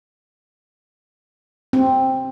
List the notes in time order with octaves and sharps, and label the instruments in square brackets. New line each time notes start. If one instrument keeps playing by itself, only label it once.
[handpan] C4